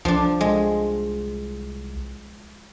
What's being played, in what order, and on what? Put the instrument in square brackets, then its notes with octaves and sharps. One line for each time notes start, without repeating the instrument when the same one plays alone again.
[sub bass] C2 [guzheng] F3 D4
[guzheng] G#3